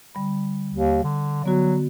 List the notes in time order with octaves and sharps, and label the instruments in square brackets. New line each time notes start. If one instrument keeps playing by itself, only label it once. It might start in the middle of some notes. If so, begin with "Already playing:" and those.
[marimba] D3 G3 B5
[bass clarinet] D#2
D3
[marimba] D3 B3 F#4 [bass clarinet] F#3